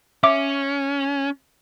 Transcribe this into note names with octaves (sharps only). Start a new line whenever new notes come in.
C#4 E5 D6